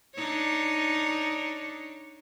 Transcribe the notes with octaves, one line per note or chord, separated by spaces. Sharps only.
D4 D#4 C#5